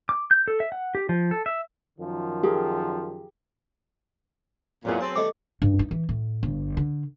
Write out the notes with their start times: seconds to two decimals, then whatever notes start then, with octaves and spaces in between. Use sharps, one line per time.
0.09 D6
0.31 G6
0.48 A4
0.60 E5
0.72 F#5
0.95 G4
1.09 F3
1.31 A4
1.46 E5
1.98 F#2 D#3 F3
2.43 G4 G#4 A#4
4.85 E2 A#2 F#3 B3 G#4
5.01 C4 B4 A5
5.16 E3 G3 A3 D#5 D6
5.62 G2
5.79 D#4
5.91 E3
6.09 A2
6.43 G1
6.77 D3